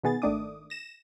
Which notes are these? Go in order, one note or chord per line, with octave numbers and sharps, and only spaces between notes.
B2 D#3 B3 G#4 A6
G#1 D#3 A3 D4 D6 D#6
A#6 E7